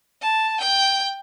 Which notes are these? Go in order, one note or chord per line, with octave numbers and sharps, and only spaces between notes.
A5
G5